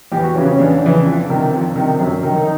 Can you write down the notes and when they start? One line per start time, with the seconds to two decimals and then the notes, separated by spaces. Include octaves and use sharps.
0.12 E2 G4
0.23 F#4
0.35 C#3 E3 C#4
0.47 C#4
0.59 E2 D4
0.82 C#3 E3
1.05 F2
1.29 C3 D#3
1.53 F2
1.76 C3 D#3
1.99 F#2
2.23 D#3
2.38 D#4